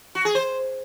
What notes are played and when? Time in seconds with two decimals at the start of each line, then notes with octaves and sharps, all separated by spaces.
0.15 F#4
0.25 G#4
0.35 C5